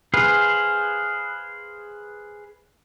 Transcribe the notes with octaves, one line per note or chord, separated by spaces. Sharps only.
G#4 B4 C5 F5